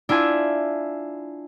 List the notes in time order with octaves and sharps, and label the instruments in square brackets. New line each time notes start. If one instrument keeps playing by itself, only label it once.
[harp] D4 E4 F4 G#5